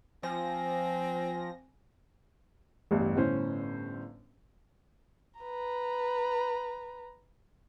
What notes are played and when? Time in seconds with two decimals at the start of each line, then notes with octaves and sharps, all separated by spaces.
0.23 F3 C4 G#5 A#6
2.91 A1 E2 G2
3.16 G1 A2 C#4 C5
5.40 B4 A#5